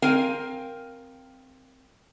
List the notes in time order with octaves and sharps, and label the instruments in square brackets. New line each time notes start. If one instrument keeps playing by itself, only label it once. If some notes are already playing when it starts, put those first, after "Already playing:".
[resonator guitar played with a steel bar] C4 A#4 F5 G5 G#5